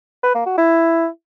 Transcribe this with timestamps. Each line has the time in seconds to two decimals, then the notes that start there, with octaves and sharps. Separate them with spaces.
0.23 B4
0.35 A#3
0.46 F#4
0.58 E4